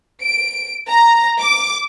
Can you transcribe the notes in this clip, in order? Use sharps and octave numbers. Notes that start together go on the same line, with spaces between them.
D7
A#5
D6